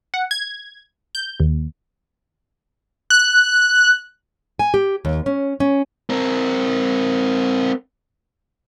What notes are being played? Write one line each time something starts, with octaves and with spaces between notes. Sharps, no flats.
F#5
G#6
G6
D#2
F#6
G#5
G4
D#2
C#4
C#4
C4 A#4